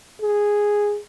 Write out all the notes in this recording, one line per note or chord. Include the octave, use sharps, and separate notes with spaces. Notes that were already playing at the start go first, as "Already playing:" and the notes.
G#4